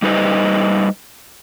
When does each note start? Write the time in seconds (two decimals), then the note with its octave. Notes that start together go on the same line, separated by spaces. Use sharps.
0.02 G3 D#4 B4 C5 D#5